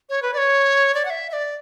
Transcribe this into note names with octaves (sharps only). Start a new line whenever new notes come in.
C#5
B4
D5
C#5
D5
F#5
E5
E5
D5